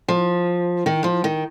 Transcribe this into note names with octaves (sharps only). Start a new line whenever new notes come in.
F3
D#3
F3
D#3